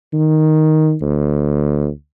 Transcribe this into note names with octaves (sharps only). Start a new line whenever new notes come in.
D#3
D2